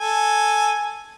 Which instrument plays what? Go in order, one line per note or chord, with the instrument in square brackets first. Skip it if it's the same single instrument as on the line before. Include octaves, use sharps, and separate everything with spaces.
[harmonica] A4 G#5